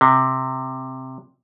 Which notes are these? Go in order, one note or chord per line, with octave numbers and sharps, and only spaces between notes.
C3